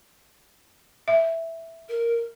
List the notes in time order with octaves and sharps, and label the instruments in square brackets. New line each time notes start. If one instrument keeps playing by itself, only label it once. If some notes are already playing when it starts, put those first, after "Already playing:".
[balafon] E5
[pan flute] A#4